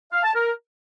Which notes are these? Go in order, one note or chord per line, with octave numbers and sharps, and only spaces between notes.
F5
A5
A#4